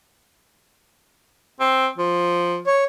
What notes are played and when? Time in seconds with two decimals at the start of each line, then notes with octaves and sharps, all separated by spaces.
1.60 C4
1.98 F3
2.67 C#5